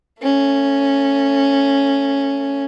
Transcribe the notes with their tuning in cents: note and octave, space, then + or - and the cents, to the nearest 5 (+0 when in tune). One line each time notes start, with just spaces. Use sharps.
A3 +30 C#4 +0